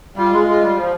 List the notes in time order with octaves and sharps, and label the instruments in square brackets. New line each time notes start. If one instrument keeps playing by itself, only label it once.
[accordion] G3 [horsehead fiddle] F4
[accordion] G#3
G#3
G3
F3